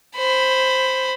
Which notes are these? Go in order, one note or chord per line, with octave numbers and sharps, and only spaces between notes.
C5 B5